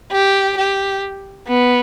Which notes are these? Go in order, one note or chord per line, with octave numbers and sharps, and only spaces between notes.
G4
G4
B3